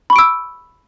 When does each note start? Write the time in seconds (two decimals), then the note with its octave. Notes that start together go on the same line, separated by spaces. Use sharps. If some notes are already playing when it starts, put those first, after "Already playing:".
0.10 B5
0.13 C#6
0.16 D7
0.19 E6